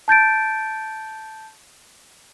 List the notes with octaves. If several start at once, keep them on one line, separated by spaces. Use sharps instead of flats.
A5 G6 A6 D7